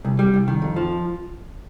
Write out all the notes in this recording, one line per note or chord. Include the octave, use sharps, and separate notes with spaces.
C2
G3
C2
D#3
F2
F3